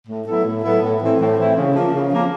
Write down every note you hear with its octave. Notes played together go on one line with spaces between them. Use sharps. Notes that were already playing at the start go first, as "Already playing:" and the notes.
A2
F#3 B3 E4 A4
A2
F#3 B3 E4 A4
A2
E3 A3 C4 E4
A2
E3 A3 C4 E4
C#3
F3 A#3
C#3
F3 A#3